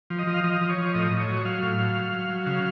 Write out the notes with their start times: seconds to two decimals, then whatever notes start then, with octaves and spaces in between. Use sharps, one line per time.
0.10 F3
0.19 D#5
0.27 F3
0.34 F5
0.44 F3 D#5
0.61 F3
0.69 C#5
0.78 F3
0.94 A2 D#5
1.11 A2
1.20 C#5
1.28 F#3
1.45 F#3 F5
1.62 A2
1.79 F#3
1.96 F#3
2.13 F#3
2.29 F#3
2.46 C#3 F5